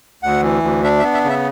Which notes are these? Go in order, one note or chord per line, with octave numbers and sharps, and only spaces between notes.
D2 F#5
E3
D2
D4 E5
E5
B3
E5
C#3
E5